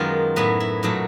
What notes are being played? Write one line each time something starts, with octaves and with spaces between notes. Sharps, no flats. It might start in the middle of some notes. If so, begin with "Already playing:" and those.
Already playing: F#2 D#3 G#3 B3 F4
A2 F#3 B3 E4
E4
A#2 F#3 A3 D#4